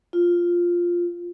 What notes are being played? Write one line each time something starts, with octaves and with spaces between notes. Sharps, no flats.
F4